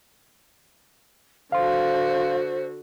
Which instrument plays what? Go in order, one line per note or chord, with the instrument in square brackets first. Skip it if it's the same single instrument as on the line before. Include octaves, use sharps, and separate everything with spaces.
[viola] D3 F#4 [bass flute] C5 [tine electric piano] F5 C6